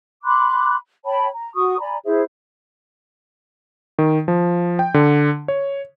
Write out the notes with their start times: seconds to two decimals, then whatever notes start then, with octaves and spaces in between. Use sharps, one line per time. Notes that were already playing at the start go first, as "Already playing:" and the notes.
0.24 B5 C6 D6 F#6
1.06 C#5 G5 A5 B5
1.33 A#5
1.54 F#4 C#6 D#6
1.79 D5 G#5 A#5 B5
2.06 E4 G#4 C5 E5
3.99 D#3
4.28 F3
4.79 G5
4.94 D3
5.48 C#5